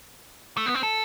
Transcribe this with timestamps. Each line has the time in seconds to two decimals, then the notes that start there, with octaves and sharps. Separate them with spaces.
0.57 A3
0.66 B3
0.75 C4
0.83 A4